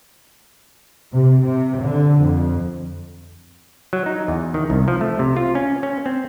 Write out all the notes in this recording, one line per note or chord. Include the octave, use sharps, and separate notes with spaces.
C3
C3
D3
F2
F#3
D#4
E2
D#3
C2
F3
A3
C3
F4
C#4
C#4
C4